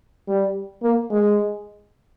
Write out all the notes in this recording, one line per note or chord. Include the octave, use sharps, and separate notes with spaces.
G3
A#3
G#3